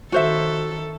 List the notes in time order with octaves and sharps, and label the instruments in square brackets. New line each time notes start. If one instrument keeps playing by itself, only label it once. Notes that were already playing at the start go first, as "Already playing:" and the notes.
[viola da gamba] D#3 A4 [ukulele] F#4 C5 E5